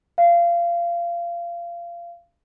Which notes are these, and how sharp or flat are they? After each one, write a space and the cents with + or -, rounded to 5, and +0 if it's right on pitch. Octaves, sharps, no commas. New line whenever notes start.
F5 -25